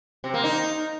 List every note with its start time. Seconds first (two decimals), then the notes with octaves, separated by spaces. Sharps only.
0.24 C3
0.34 A#3
0.44 D#4